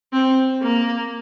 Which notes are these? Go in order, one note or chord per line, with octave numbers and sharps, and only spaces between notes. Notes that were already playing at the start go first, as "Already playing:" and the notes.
C4
A#3